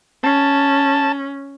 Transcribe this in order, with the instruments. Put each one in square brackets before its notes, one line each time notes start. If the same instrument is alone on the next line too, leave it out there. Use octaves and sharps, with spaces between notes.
[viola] C#4 [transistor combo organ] A5